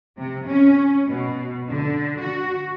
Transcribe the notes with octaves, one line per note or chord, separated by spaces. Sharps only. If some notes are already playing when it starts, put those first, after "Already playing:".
C3
C#4
B2
D3
F#4